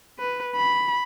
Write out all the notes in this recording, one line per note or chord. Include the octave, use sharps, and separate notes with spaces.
B4
B5